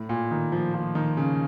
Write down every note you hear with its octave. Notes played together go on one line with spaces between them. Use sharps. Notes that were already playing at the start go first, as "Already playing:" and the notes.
Already playing: A2
A#2
D#3
F3
F3
D#3
C#3